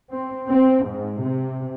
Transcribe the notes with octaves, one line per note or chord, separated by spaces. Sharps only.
C4
C4
G#2
C3